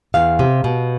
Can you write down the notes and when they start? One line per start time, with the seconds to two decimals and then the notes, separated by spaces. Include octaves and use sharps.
0.14 E2 F5
0.39 C3
0.64 B2